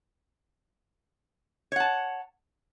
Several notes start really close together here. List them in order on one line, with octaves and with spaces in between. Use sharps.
C#5 F#5 A5